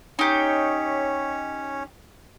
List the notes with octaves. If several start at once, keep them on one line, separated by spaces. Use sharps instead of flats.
C#4 D#4 G4 C#5